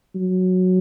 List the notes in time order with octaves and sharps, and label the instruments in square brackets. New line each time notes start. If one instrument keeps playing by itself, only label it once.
[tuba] F#3